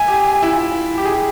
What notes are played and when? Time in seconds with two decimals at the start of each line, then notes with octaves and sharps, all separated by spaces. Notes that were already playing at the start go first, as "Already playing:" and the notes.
Already playing: E5 G#5
0.08 G4
0.42 E4
0.53 F4
0.98 G4
1.05 G#4
1.12 G4